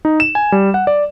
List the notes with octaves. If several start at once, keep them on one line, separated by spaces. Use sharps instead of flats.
D#4
E7
G#5
G3
F#5
D5